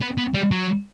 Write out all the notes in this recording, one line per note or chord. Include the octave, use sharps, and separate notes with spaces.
B3
B3
G3
F#3